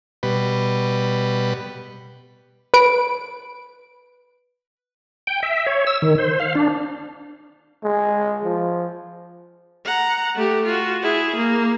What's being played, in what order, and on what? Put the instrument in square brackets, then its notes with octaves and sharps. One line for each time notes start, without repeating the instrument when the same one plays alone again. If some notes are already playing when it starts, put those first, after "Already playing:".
[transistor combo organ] B2 G3 B4
[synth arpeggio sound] B4 D7
[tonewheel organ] G5
E5
C#5
E6
D#3
C5
F5
D4
[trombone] G#3
F3
[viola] F#5 A#5
A3 G4
F4 F#4
E4 G#4
A#3